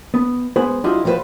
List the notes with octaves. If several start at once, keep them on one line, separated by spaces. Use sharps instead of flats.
B3
G#3 B3 C5 G#5 B5
F#3 D4 E4 F4 G4 D#5
B1 F3 G3 F#4 B4 C5